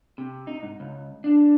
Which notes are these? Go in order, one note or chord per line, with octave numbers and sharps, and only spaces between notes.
C3
D#4
G#2
C#2
D4